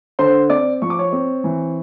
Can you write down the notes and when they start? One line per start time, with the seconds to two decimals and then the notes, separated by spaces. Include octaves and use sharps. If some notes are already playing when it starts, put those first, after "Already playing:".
0.19 D3 C5 C6
0.49 C4 D5 D6
0.82 F3 C#6
0.90 D6
0.99 C#5 C#6
1.12 C4
1.44 E3